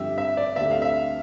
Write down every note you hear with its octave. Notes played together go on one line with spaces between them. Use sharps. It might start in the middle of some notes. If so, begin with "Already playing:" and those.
Already playing: G2 D3 F3 C4 G4 E5
E5
D5
D2 D3 A3 C4 G4 E5
F5
E5